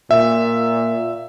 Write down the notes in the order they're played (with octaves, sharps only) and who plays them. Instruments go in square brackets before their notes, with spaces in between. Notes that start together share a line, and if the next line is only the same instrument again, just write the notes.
[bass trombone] A#2 [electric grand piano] E5